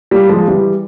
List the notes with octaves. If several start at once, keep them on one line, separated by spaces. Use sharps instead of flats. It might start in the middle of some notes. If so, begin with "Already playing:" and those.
G3 A#3
F3 G#3
E3 G3